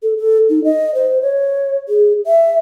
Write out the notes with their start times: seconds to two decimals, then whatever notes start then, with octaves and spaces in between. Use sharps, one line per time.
0.03 A4
0.18 A4
0.50 D#4
0.64 D#5
0.95 C5
1.22 C#5
1.89 G#4
2.27 E5